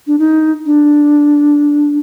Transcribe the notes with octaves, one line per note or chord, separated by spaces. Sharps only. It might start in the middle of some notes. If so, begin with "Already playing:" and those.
D4
D#4
D4